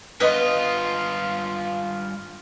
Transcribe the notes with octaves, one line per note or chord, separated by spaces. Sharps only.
G2 B3 F4 D#5